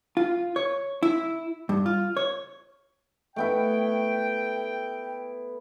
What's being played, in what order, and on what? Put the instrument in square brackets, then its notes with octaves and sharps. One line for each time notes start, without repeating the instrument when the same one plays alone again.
[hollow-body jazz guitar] F4
C#5
E4
G2
F4
C#5
[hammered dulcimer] A3 B3 E4 [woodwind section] G5